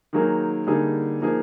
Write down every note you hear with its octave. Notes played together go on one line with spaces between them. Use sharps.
D#3 F#3 A#3 D#4 G#4
D3 G3 A#3 D#4 G#4
F3 A#3 D#4 G#4